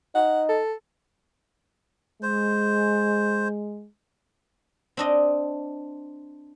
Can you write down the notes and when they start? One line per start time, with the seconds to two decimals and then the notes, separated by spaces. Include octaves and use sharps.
0.15 D#4 F#5
0.49 A4
2.23 G#3 C5
4.97 C4 D4 D#5